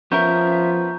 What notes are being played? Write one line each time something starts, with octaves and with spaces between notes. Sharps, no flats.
F3 B3 C#4 A#4 E5 A#5 C#6 G6